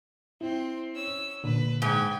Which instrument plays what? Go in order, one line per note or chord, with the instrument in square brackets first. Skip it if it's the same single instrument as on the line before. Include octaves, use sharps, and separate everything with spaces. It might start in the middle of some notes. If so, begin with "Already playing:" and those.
[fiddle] C4 C6 [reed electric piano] E4
[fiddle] C#4 E6
[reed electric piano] A#2 [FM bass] D3 [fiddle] B4
[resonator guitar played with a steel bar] G#2 [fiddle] G5 G#5